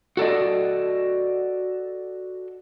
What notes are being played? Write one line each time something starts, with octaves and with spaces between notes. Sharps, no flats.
F#4 A4 D5 D#5